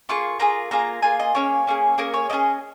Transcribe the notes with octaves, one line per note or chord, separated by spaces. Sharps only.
A#3 F4 G#4 C#6
A#3 F4 G#4 A#5
A#3 F4 G#4 A#5
A#3 F4 G#4 G#5
D#5
A#3 C#4 G#4 C#5
A#3 C#4 G#4
A#3 C#4 G#4 A#4
C#5
A#3 C#4 G#4 D#5